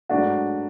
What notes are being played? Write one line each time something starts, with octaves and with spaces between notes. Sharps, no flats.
G#2 F#3 A3 D4 F#4